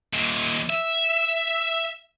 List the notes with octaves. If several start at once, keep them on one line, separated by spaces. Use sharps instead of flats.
D#2 A#2
E5